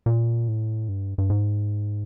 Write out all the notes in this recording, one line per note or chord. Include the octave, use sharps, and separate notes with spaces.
A#2
A2
G2
G2
G#2